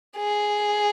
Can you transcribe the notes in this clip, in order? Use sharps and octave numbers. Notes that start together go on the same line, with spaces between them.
G#4